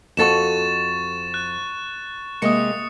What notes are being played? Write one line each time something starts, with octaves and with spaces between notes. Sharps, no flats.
F2 F#4 A4 C#6 A6 E7
F#6
C3 G#3 A#3 D#6 C#7